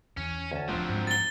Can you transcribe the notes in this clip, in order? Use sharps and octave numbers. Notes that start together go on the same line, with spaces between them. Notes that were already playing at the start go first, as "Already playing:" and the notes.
E2 E3 C#4
D2 C#4 A5
D#1 C2 F3 F#3 A3 C4 D4
G#2 G#3
A6 G7